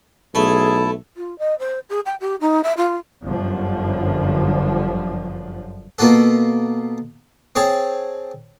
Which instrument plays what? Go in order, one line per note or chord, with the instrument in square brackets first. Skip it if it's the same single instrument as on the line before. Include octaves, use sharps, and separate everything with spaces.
[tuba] B1 [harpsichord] A3 [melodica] E4 A5 [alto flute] G#4
[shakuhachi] F4
D#5
C5
G#4
G5
G4
D#4
E5
F4
[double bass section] G1 F#2 D3 F3
[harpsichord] B2 A#3 F4 F#4 A4
C4 G#4 C#5 A5